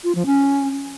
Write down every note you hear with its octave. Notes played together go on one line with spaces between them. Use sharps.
F4
F3
C#4